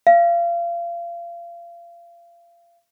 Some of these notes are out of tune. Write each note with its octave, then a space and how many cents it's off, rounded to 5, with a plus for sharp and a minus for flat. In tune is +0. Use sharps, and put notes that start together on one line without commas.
F5 -30